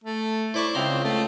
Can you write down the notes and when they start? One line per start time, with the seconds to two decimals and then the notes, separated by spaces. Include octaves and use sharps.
0.04 A3
0.54 E4 C5 D5 C#6
0.75 C#2 C4 A#5 C6
1.04 A3